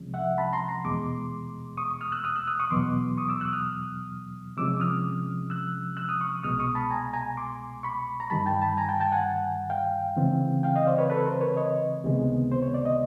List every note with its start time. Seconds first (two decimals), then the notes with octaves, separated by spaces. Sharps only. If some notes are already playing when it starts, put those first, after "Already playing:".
Already playing: C2 C3 F3 G#3 C#4
0.14 E5 F#5
0.38 A5 B5
0.53 A#5 C6
0.68 A#5 C6
0.85 E2 B2 G#3 C6 D6
1.77 C#6 D#6
2.01 D#6 F6
2.12 E6 F#6
2.24 D#6 F6
2.36 E6 F#6
2.47 D#6 F6
2.59 C#6 D#6
2.70 E2 B2 F#3 C6 D6
3.17 C#6 D#6
3.29 D6 E6
3.40 E6 F#6
3.52 D#6 F6
4.57 C3 F3 G#3 C#4 D6 E6
4.80 D#6 F6
5.50 E6 F#6
5.97 E6 F#6
6.08 D#6 F6
6.21 C#6 D#6
6.43 C2 B2 G#3 D#6 F6
6.59 C#6 D#6
6.75 A5 B5
6.91 G#5 A#5
7.13 G#5 A#5
7.37 C6 D6
7.83 B5 C#6
8.20 A#5
8.30 G2 D#3 G3 A5 B5
8.46 G5 A5
8.61 A5 B5
8.77 G#5 A#5
8.89 G5 A5
9.00 G5 A5
9.12 F#5 G#5
9.70 F5 G5
10.17 C#3 E3 G#3 C4
10.63 F5 G5
10.76 D#5 F5
10.87 C5 D5
10.98 B4 C#5
11.10 A4 B4
11.26 A#4 C5
11.41 B4 C#5
11.56 C#5 D#5
12.04 C#2 C3 D#3 G#3 B3
12.52 C5
12.62 C#5
12.74 D5
12.85 D#5